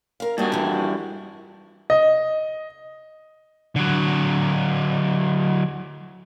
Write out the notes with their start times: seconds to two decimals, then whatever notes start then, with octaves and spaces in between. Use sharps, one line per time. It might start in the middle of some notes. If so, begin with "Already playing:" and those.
0.20 A#4 F5
0.38 G2 A#3 F#4 D#5
0.52 F2 E3
1.90 D#5
3.76 D3 F#3